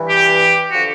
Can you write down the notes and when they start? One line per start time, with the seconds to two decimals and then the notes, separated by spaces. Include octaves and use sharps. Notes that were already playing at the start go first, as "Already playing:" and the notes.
Already playing: G2 E3
0.09 G4
0.71 D3 F3 F#4